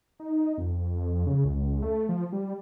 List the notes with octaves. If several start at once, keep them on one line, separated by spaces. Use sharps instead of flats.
D#4
F2
C#3
C#2
A3
F3
G3